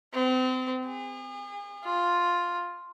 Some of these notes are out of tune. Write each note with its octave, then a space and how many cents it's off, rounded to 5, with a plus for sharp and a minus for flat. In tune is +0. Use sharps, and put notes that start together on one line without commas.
C4 -35
G#4 -40
F4 +5